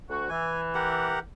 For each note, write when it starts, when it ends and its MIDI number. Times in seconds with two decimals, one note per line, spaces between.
0.09 0.27 38
0.09 0.27 66
0.29 1.18 52
0.29 0.61 80
0.75 1.19 67
0.75 1.19 70
0.75 1.19 78